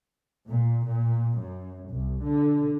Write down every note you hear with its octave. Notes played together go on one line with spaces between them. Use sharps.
A#2
A#2
F#2
C2
D3